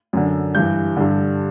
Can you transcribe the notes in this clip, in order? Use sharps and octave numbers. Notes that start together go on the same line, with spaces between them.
F#2 D3
G2 E3 G6
G2 D3